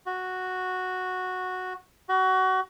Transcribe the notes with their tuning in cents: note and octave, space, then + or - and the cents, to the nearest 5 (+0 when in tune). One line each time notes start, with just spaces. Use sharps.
F#4 -5
F#4 +25